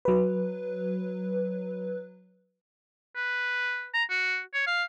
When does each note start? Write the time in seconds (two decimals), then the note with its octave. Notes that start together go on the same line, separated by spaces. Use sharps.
0.05 F#3 B4
3.16 B4
3.94 A#5
4.10 F#4
4.54 C#5
4.67 F5